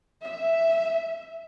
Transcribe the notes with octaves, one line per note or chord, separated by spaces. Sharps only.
E5